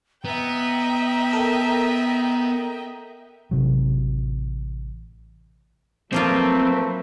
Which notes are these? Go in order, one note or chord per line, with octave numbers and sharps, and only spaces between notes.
B3 D#5 E5 G5 A#5
A4 A#4
A1 C3 F#3
F3 F#3 A3 A#3 C4 F4 B4